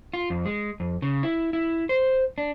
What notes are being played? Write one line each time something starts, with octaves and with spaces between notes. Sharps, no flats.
F4
F2
G#3
F2
C#3
E4
E4
C5
D4